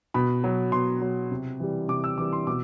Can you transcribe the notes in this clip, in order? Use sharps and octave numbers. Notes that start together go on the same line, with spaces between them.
B2 B5
F#3
B2 C6
F#3
C3
E3 G3
C3 D6
E6
E3 G3 D6
C6
B2 D6